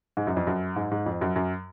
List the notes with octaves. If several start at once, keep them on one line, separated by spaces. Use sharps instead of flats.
G#2
F#2
F2
F#2
G#2
G#2
F2
F#2
F#2